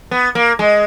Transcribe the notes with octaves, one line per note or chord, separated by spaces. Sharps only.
B3
A#3
G#3